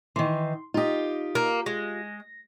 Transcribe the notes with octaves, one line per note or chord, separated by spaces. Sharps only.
D#3 E3 C6
D#4 F4 G4 D#5
A#3
G#3 A#6